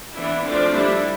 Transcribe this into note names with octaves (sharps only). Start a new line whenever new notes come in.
E3 B3 D4 E4
F3 A3 C4 D4
G3 D4 E4